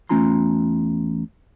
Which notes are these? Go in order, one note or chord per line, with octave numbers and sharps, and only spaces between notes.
E2 A3 C#4 F4 A#5 C6